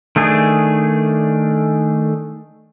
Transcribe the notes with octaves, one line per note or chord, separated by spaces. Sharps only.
D#3 A3 D4 G#4